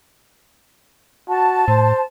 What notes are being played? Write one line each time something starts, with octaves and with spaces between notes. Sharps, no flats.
F#4 A5
A2 C5